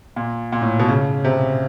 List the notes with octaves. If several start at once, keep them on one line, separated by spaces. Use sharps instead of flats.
A#2
A#2
A2
B2
C#3
C3